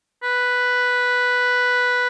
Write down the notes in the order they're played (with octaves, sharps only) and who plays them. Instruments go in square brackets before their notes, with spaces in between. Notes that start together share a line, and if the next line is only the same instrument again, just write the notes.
[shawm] B4